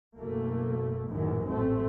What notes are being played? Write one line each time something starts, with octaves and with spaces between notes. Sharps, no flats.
F#1 B2 A3 A#3
A#1 F#2 A2 D#3 E3
A1 A#2 A3 C4